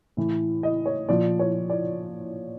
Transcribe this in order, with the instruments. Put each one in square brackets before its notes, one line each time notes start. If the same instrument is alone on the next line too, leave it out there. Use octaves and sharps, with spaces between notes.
[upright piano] A2 E3
D#5
C#5
A#2 F3 D5
C#5
D5